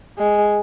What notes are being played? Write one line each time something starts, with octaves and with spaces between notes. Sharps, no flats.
G#3